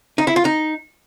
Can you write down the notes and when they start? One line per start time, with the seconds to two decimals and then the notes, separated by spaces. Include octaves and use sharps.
0.18 D#4
0.27 E4
0.36 F4
0.45 D#4